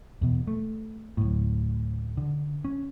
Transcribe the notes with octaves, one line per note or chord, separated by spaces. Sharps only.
E2 B2
A3
D1 G#1 A2
D3
C#4